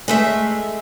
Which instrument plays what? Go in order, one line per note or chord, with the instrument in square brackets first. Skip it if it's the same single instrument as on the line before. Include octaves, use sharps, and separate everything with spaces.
[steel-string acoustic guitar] G#3 A3 E5